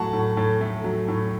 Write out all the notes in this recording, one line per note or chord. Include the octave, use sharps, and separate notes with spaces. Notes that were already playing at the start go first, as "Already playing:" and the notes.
Already playing: A2 F#3 A3 F#5 G#5 A5 C#6
A2
A2
A3
F#3
A2